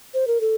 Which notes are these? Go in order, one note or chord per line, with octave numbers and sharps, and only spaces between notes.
C5
A#4
A4